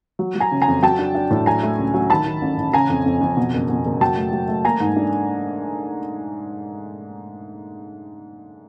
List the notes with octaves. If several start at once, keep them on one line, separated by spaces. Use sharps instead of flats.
F#3
F#3
G#5 A#5
C#3
G#5 A#5
F2
F#3 G5 A5
D4
D4
A2
F#3 G#5 A#5
A3
C#2
F#3
D#3 A5 B5
D#3
A1
A1
C#3 G#5 A#5
F2
F2
F2
B2
F#1
B2
F#1
F#3 G5 A5
A3
F#3
A3
A#3 G#5 A#5
G#2
D4